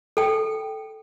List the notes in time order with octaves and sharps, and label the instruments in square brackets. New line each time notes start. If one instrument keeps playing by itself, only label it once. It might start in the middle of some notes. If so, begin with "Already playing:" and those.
[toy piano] A4 G5